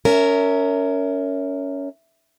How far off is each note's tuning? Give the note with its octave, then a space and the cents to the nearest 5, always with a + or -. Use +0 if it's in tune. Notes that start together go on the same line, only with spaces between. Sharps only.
C#4 +15 A#4 -15 E5 -15